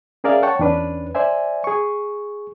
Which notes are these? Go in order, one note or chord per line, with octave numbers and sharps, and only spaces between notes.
C#4 G#4 A#4 D5 E5 F5
C#5 F#5 G5 A5 C#6
E2 C#4 D4 B4
C5 D5 E5 G#5
G#4 C#6